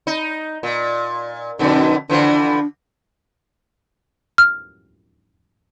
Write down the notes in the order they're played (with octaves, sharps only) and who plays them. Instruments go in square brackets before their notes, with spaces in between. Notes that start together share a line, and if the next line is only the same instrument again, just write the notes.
[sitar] D#4
A#2
[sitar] F2 B2 D3 [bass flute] D#4
[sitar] D3 E3 F3 [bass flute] D4
[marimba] F6